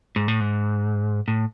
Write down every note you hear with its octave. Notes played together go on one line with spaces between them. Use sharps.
G#2
A2
G#2
A2